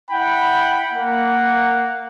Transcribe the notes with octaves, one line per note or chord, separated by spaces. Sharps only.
E4 F#5 G5 B5
A#3 F#5